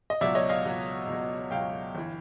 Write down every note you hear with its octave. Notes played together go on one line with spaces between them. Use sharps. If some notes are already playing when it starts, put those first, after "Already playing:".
D#5
C#2 B2 F#3 D5 E5
C#5 D#5
D#5 F5
C#2 B2 F#3
C#2 B2 F#3
C#2 B2 F#3 F5 G5
G1 E3